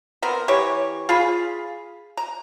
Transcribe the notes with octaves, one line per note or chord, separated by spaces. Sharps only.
B3 C4 A#4
E3 G4 C#5
F4 G#4 B5
A#5